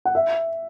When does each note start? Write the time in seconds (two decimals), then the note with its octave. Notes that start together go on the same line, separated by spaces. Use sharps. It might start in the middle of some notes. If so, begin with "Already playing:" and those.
0.05 F#5
0.15 E5